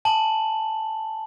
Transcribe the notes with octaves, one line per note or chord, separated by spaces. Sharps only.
G#5 A5 F#7